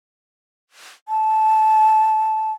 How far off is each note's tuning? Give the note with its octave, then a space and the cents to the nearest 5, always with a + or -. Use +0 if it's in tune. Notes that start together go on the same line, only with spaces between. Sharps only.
A5 -15